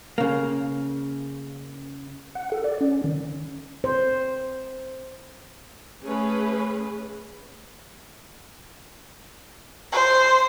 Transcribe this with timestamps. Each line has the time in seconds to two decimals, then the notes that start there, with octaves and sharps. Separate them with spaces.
0.18 C#3 A#3
2.35 F#5
2.52 A4
2.64 D5
2.81 C#4
3.04 D#3
3.84 C5
6.03 A3 C#4 G#4 B4
9.92 C5